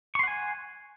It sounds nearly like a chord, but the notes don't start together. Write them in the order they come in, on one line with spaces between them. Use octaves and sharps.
C#6 C6 F#5 G#5